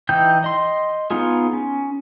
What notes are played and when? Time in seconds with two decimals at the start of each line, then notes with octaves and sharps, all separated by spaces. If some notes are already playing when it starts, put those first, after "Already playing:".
0.09 E3 D#4 G5 G6
0.44 D#5 C6
1.11 B3 D#4 F4 G#4
1.53 C#4